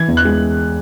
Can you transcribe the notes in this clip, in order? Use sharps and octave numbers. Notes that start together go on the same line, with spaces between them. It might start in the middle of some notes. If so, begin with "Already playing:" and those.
Already playing: E3 G#6
E2
F#6
G#3